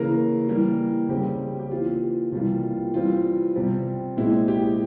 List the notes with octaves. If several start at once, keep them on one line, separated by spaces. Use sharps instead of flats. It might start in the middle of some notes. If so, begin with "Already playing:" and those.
Already playing: C#3 E3 A#3 A#4
E3 G3 A#3
C#3 G3 C4 G4
G4
E3 A#3 F4
C3 E3 G3 A#3 F4
F4
E3 G3 C4 F4
C3 G3 C4
A#2 G#3 C4 E4
G4